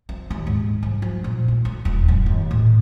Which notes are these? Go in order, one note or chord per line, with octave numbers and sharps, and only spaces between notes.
C4
D#2
G#2
C2
F3
A#2
A3
D2
D#1
F#2
D#2
A2